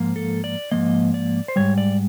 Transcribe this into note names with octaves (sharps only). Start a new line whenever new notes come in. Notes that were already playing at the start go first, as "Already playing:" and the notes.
Already playing: G#2 F3 A#3
A4
D5
G#2 F3 A#3 D#5
D5
C5
G#2 D#3 G3 C#5
D5